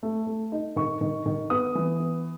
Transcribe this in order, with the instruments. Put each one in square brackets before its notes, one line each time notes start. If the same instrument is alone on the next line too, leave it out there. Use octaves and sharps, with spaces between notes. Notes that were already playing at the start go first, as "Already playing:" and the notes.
[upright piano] A3
A3
D#4
D#3 C#6
D#3
D#3
B3 D#6
E3
B3